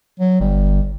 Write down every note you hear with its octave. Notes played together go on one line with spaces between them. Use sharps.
F#3
G1 G3